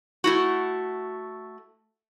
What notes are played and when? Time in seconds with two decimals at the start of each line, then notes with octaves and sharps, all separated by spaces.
0.24 A3 E4 F#4